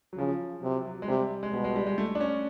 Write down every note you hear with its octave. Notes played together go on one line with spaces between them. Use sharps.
F#3
C#3 F3
C3 F#3
F#3
G#3
C3 G3
G#3
B2 G3
G#3
G3
G#3
A3
D4
C#4